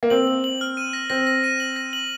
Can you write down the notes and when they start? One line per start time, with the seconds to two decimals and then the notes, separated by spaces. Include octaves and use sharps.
0.03 A#3
0.10 C4 F#7
0.27 F#7
0.44 F#7
0.61 F6
0.77 D#7
0.93 A#6
1.10 C4 A#6
1.27 A#6
1.44 D#7
1.60 F#7
1.76 A#6
1.93 F#7